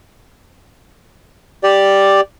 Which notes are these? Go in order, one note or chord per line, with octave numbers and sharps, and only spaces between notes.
G4 D5